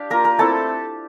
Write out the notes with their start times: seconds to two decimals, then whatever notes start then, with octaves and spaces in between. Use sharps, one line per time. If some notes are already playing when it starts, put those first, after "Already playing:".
Already playing: D4 G4 F5
0.10 A#3 F4 A#4 A#5
0.24 A#4 A#5
0.38 A3 C4 E4 A4 A5